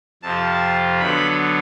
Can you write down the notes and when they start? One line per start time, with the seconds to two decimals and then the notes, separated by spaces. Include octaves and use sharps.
0.23 F2 C3 F3 A5
1.00 D3 F#3 B3 B5